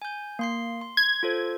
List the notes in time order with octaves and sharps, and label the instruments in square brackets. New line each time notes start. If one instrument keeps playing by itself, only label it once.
[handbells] G#5 G6
A#3 C6 C7
C6
[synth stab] G#6
[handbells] F4 A4 C5